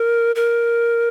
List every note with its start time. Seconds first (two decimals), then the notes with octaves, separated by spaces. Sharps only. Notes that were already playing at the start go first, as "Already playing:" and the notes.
Already playing: A#4
0.36 A#4